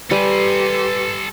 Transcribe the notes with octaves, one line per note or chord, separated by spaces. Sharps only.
G3 G4 A4 B4 G#5 C6